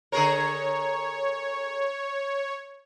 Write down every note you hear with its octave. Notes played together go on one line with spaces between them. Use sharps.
D3 G#4 A#4 C#5